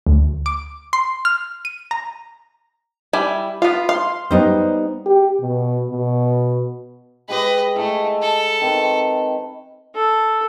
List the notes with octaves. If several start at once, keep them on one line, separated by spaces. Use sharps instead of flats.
D2
D6
C6
F6
D#7
A#5
G3 E4 G#5
B3 F4 F5
F5 C6
G3 B3 D#4 C5
G4
B2
B2
G#3 G4 B4 D#5 C6
A3 E4 D#5 G#5
A4
D#3 C4 B4
A4